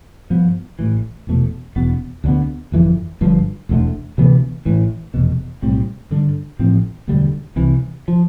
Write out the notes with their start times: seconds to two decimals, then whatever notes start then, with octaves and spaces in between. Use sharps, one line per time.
0.30 G2 F3 B3
0.79 A1 A2 E3
1.27 F1 E2 B2 A3
1.76 E1 E2 B2 B3
2.24 D2 D3 F3 B3
2.72 G1 F2 E3
3.21 G1 G2 F3
3.69 E1 D2 D3 A3
4.18 D2 C3 E3 B3
4.65 A1 A2 E3
5.14 F1 E2 B2
5.62 B1 A2 G3 C4
6.10 G2 D3 G3 D4
6.59 A1 A2 F3 C4
7.08 E1 D2 D3 G3
7.56 C2 C3 E3
8.08 F3